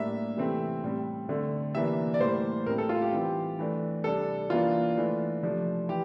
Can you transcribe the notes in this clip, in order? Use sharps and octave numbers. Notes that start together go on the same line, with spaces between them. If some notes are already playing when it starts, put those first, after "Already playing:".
Already playing: A2 G3 A#3 D4 E5
C3 E3 A3 C4
A2 G3 C4
D3 A3 C4
C3 E3 A#3 D4 E5
D5
A2 E3 G3 A#3 C5
A2 G3 C4 A#4
A4
F4
G4
E3 G3 C4
E3 A3 D4
C3 G3 D4 A4
E3 A#3 D4 F4
E3 A3 D4
C3 F3 A3 D4
E3 G4